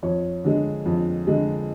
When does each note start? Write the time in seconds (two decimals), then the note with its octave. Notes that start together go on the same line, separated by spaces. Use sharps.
0.03 F2 C#5
0.44 D3 G#3
0.86 F2
1.27 D3 G#3